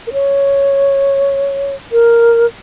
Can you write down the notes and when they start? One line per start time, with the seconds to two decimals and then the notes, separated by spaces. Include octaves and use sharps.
0.07 A#4
0.13 C#5
1.92 A#4